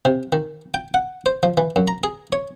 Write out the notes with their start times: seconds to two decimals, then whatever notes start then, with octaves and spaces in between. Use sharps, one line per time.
0.05 C3
0.32 D#3
0.74 G5
0.94 F#5
1.26 C5
1.43 F3
1.57 E3
1.76 F#2
1.88 A#5
2.03 G#4
2.32 C#5